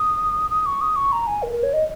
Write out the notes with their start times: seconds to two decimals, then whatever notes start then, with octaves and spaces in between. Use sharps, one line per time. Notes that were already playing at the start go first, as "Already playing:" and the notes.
Already playing: D#6
0.50 D#6
0.66 C#6
0.81 D#6
0.96 C#6
1.12 A#5
1.27 G#5
1.43 A#4
1.53 A#4
1.63 C#5
1.73 D#5